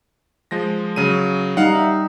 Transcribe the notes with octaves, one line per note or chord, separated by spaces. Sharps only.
F3 G#3 A#6
C#3 F#3 D#7
G3 D#4 F5 F#5
E5